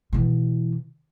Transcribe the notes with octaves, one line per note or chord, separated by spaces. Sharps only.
B2 E3